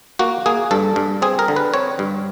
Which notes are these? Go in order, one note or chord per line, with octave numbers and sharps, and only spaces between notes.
A#3 F#4
A#3 G#4
G2 A4
G2
C4 G#4
A#4
D3
B4
C4 C#5
G2